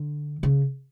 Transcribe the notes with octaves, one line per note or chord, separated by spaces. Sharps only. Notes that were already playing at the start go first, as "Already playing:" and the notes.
Already playing: D3
C#3